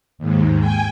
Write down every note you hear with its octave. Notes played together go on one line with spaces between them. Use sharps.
D#2 G#2
G5 G#5